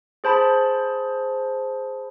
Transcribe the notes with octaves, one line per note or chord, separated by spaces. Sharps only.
G#4 C5 A5 B5